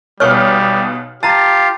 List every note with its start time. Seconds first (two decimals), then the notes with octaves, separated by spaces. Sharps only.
0.20 B1 B2 G3 C#5 C#6 F6
1.23 F4 G4 F5 A5 A#5 A6